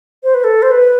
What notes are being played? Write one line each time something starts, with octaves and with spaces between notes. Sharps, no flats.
C5
B4
A4
C5
B4